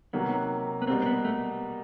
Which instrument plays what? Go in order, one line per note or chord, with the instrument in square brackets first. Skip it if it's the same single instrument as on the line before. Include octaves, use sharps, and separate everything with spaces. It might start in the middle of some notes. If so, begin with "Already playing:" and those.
[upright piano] C3 D#3 F#3 A#3 [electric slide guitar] B3
[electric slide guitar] B3
[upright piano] B2 G3 A#3 [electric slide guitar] C4
[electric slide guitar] C4
B3
A3